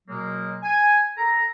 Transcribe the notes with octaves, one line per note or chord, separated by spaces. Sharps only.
B2 F#3 G#3 A#3
G#5
A4 A#5